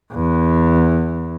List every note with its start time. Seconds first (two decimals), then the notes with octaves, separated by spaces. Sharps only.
0.12 E2